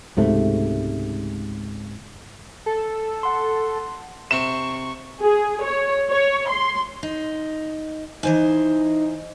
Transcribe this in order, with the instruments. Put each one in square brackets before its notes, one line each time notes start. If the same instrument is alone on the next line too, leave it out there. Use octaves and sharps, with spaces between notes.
[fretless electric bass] C#2 G#2 C3 A3
[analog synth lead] A4
[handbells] F#5 C6
[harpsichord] C3 C4 [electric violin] C#6 [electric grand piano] E7
[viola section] G#4
C#5
C#5
C6
[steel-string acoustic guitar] D#4
[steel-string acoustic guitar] E3 C5 G#5 [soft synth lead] D#4